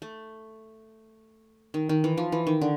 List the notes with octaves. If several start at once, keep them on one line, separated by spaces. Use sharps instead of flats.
A3
D#3
D#3
E3
F3
E3
D#3
D3